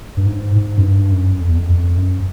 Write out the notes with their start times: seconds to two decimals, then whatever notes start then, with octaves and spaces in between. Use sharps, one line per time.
0.17 G2
0.27 G#2
0.55 G#2
0.78 F#2
0.83 G2
1.12 F#2
1.40 F2
1.49 E2
1.57 F2
1.69 F2
1.97 F#2